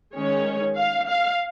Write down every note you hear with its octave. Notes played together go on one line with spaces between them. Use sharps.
D#3 G#3 C#4 C#5
F5
F5